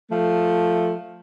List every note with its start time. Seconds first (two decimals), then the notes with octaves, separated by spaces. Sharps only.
0.10 F3 A3